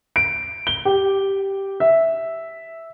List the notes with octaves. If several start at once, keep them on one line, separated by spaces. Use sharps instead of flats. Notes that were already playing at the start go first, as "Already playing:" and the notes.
D7
G7
G4
E5